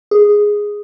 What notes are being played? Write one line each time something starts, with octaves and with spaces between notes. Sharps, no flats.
G#4